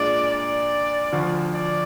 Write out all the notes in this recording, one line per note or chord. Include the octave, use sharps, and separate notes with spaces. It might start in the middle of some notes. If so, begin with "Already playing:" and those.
Already playing: A#2 G#3 D4 D5
D5
D2 D3 F3
D5